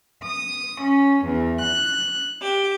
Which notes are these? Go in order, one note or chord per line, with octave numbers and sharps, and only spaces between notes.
D#6
C#4
E2
F#6
G4